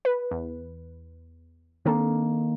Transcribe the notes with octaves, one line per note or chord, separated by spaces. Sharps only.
B4
E2
D#3 A#3 C4 D4 A4